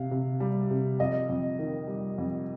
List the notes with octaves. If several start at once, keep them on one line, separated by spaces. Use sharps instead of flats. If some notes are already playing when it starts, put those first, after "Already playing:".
Already playing: C3 F5
C3
G3
C3
F2 D#5
F2
D#3
G3
F2